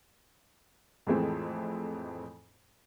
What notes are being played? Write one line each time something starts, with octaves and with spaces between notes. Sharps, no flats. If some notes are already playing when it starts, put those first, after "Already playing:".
F2 A2 E3 G#3 A3 C4